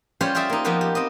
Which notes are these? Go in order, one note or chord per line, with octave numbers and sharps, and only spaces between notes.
G3 C#4 F4 G4 C5 C#5
F4 G4 G#4 D5 E5
A#3 D#4
F3 A#3 B3 G4 B4
G4
C4 D#5